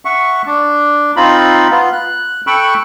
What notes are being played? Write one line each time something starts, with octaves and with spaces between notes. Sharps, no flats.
E5 F#5 C#6
D4
C4 D#4 F4 B5
B3 F4
F#6
A4 G5 B5 C#6 E6 F#6